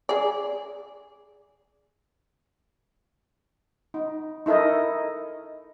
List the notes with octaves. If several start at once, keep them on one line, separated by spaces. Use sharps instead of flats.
G#4 D5
D#4
D#4 E4 A4 A#4 D#5